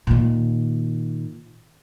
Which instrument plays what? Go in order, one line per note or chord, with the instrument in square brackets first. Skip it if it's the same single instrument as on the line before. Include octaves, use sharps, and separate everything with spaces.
[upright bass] A#2 D#3